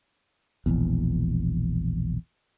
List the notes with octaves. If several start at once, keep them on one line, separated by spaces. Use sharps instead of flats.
E1 A#1 E2